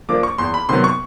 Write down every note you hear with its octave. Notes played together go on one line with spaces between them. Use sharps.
F3 A#3 D4 D6
C#6
E2 C6
B5
C3 D#3 F#3 B3 C6
C#6